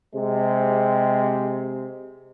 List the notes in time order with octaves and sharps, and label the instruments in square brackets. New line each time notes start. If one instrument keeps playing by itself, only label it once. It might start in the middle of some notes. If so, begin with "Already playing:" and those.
[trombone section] C3 G#3